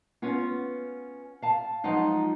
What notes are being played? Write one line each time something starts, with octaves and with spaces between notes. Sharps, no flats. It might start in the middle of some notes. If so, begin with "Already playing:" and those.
B3 C#4 F4
F5 A5
F3 F#3 G#3 D#4 F4